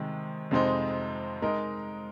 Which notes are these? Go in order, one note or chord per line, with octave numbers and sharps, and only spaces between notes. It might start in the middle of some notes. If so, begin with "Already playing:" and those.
Already playing: C3 D#3 G#3
F2 C3 G#3 C4 D#4
G#3 D#4 A#4